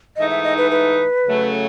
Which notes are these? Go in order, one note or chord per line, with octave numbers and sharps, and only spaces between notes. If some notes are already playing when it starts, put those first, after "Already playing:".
G#2 E3 A3 D#4 D#5
E5
D#5
B4
B4
C#3 F#3 A3